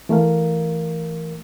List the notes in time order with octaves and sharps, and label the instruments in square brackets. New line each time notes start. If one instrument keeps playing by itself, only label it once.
[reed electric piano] E3 A3 A#4 F5